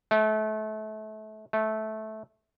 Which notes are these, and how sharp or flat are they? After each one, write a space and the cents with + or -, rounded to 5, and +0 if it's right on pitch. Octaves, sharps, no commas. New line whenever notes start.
A3 -30
A3 -15